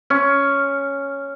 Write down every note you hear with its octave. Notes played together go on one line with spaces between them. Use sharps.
C#4